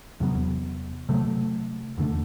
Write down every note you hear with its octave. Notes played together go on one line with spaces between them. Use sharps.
E2 C3 F#3 B3
C3 F#3 A3
E2 D3 A3